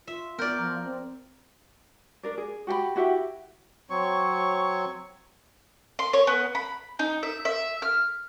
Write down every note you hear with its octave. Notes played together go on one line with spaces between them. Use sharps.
F4 E5
B3 A#4 D5 F6 G6
F3 A#5
C4
D4 A#4 D5
G#4
F#4 G4 G5 B5
E4 F#4 G4 E5
F#3 C4 C#5 C#6
C6
C#5
B3
B5
D#4
E5
E5
F6